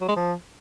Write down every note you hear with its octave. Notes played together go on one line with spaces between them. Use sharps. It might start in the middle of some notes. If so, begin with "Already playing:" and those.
F#3
G#3
F3